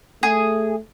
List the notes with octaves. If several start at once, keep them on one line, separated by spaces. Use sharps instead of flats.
A3 G#4